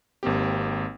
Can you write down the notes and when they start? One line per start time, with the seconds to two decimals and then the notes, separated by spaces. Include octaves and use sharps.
0.23 G#1 A#3 C4 G4